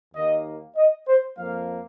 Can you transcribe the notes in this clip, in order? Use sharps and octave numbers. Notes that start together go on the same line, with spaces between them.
D#2 D#3 A#3 D#5
D#5
C5
F2 F3 A#3 F5